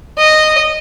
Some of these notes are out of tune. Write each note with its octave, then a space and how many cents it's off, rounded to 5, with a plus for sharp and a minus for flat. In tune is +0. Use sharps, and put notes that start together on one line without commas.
D#5 -10